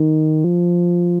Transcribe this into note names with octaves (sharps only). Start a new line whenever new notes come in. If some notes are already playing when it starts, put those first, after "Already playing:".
Already playing: D#3
F3